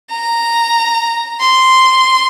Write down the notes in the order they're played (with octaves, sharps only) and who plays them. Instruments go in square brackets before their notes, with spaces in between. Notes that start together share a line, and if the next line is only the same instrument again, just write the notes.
[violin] A#5
C6